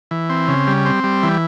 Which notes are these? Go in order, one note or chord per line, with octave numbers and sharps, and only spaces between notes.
E3
C4
C#3
G3
C4
G3
E3